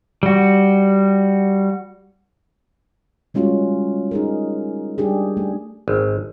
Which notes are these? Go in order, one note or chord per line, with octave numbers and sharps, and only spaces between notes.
G3 F#4
G3 G#3 C#4 F4 F#4
D#4 G#4 A#4
G3 D4 G4 G#4
A3
G#1